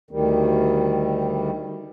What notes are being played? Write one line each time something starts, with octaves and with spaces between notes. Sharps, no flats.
D2 D#3 G3